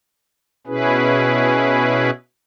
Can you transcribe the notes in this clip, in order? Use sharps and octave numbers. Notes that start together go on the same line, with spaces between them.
B2 C#4 E4 G#4 B4